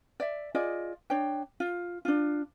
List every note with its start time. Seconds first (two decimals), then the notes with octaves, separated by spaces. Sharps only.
0.20 D5 E5
0.55 F4 G#4 D5 D#5
1.10 D4 C#5 G5
1.60 F4
2.05 D4 F4